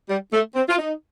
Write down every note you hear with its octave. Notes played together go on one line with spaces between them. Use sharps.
G3
A3
C4
F4
D#4